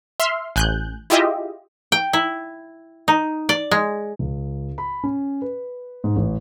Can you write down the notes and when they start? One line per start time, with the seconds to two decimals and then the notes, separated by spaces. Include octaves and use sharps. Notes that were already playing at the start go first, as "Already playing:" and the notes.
0.20 E5 C6 F6
0.56 A1 G#5 F#6 G6
1.10 E4 F4 G4 G#4 D#5 E5
1.92 G5
2.13 E4
3.08 D#4
3.49 D5
3.71 G#3
4.19 C#2
4.78 B5
5.04 C#4
5.42 B4
6.04 G#2
6.16 A1